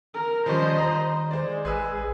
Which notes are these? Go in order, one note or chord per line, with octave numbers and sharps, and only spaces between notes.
A#4
D#3 F3 G3 C#4 C5 D#5
A#5
G#3 C5 D5
A1 G#4 B4 E6